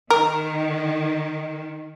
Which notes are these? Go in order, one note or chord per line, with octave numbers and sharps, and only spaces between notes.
D#3 A#4